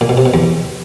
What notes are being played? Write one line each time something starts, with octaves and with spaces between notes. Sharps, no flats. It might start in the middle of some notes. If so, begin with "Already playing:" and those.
A#2
B2
C3
B2
E2